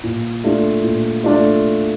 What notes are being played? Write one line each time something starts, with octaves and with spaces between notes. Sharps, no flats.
A#2
A3 D4 F4
A#2
A3 D4 F4